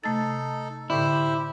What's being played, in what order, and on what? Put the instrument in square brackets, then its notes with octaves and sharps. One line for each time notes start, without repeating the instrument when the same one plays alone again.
[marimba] C3 A3 A6 [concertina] D#4 A4
[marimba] A2 D3 [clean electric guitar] E4 [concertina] G4 C5